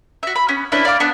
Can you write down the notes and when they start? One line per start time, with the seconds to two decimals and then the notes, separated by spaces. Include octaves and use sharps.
0.23 F#4 E5
0.36 B5
0.49 B3 C#4
0.72 C#4 D4 E4 B4
0.85 D5 F5 B5 D6
1.00 B3 D4 F#5